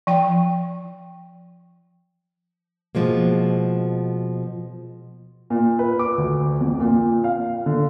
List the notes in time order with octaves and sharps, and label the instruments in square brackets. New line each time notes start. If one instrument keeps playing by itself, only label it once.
[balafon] F3 G5
[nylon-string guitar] B2 F3 G#3 A#3
[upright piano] A#2
B4
D6
D2
F2
A#2
F5
D3